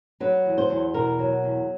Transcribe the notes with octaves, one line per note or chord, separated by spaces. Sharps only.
F#3 B4
E2
C5
E2
B2 A#4
F#3
E2